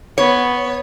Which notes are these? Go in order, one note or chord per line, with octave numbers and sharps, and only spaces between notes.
B3 C#5